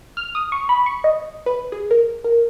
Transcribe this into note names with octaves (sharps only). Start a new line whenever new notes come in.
F6
D#6
C#6
B5
C#6
D#5
B4
G#4
A#4
A#4